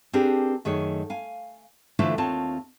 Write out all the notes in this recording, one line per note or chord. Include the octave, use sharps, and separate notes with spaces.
C4 D4 G4 G#4 A#4 B4
F#2 D#3 A3 G#4 C#5
F5 G#5
D3 E3 A3 E4 F4 C5
D#2 C4 F4 C#5 A5